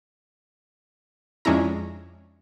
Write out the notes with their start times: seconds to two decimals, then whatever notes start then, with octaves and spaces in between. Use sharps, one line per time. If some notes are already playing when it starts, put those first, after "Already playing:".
1.45 F2 G#3 C#4 D4 E4 A#5